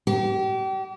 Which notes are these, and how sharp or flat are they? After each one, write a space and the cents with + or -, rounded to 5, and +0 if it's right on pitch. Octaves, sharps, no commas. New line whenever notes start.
G4 -35